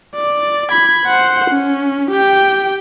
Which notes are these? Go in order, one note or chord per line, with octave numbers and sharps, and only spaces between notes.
D5
B5 G#6
C5 F#5
C#4
G4 G5